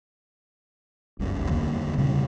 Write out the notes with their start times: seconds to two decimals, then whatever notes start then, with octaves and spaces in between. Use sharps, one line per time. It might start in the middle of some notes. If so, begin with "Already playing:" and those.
1.19 F#1 C#2 G2
1.51 E2 D3 G3 A#3
1.98 A#2 C#3 G3 C4